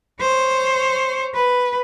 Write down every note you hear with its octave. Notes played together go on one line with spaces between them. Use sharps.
C5 C#5
B4